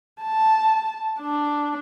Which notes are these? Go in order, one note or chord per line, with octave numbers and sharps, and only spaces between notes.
A5
D4